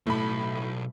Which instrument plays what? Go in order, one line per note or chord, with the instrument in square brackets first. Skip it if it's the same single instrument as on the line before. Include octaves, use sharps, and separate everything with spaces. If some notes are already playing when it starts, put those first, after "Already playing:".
[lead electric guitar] B1 A4 [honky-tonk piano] A2 B5